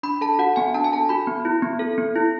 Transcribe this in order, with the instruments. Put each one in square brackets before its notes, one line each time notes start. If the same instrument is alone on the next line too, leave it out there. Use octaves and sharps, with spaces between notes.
[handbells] D4 B5
A4 A5
F#4 F#5
B3 G#5
D4 A5
G#5
A4 A5
F#4 B5
B3
E4
B3
A4
B3
E4